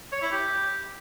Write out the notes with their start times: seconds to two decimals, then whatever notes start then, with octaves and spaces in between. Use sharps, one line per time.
0.12 C#5
0.22 E4
0.32 G4